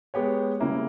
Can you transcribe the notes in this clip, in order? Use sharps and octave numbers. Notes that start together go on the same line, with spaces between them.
G#3 B3 G4 C#5
C#3 G3 A#3 E4